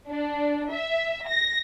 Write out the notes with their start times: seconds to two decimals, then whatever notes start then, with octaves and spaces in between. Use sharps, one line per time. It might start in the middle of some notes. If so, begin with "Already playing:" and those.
0.10 D4
0.71 E5
1.28 A#6